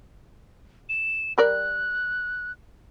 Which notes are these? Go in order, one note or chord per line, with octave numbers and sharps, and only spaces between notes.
E7
G3 A#4 D5 F#6